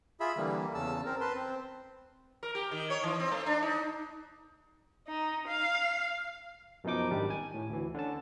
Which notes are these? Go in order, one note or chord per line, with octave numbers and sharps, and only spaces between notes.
F4 G#4 E5 B5
D3 E3 G3 A#3
E2 C#3 A5 E6
C4 A#4
B4 A5 C6
C4
A#4
G4
D#3
C#5
E3
C4
A3
D4
D#4
D#4
F5
F#2 B2 F3 D#4 D6
G#1 D#3 G3 D4
G#5
A2
D2 E3
D3 C#4 A5